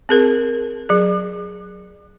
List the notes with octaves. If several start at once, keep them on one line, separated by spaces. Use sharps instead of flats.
C4 G#4 A#4
F#3 G#4